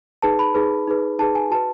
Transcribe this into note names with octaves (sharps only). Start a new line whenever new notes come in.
D#4 G#4 B4 A5
B5
D#4 G#4 B4
D#4 G#4 B4
D#4 G#4 B4 A5
G#5
F#4 B4 A5